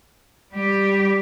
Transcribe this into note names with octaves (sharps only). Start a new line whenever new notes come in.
G3 G4